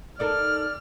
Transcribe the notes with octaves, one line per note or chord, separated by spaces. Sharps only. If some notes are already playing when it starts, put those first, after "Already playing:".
D#4 A4 A#4 D5 F6